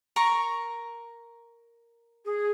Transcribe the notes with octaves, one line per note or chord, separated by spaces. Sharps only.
A#4 A#5 C#6
G#4